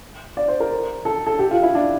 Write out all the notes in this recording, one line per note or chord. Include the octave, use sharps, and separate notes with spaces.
D5
C5
A#4
A4
A4
G4
F4
E4
D4